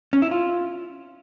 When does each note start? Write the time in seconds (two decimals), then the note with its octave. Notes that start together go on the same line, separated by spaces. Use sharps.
0.13 C#4
0.22 E4
0.31 F4